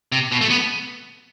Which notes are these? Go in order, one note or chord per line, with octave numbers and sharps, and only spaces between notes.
C3
B2
A3
B3